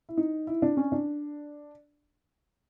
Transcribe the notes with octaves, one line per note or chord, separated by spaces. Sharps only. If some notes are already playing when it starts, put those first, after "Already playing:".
E4
D#4
E4
D4
C#4
D4